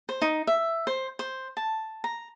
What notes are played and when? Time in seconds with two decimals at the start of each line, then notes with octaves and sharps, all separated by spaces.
0.09 C5
0.22 D#4
0.47 E5
0.87 C5
1.19 C5
1.57 A5
2.04 A#5